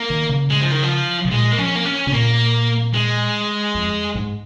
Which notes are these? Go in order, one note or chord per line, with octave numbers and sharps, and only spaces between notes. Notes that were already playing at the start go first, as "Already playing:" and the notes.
Already playing: A#3
D#3
C#3
G#3
F3
D#3
F3
C#3
A#2 G#3
A#3
F3 C#4
A#3
C#4
C#3 C#4
A#2 A#3
G#3
F2
G#2